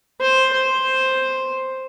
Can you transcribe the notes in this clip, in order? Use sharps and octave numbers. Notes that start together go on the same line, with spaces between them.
C5
C5